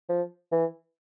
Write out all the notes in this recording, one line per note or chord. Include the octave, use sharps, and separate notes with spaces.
F3
E3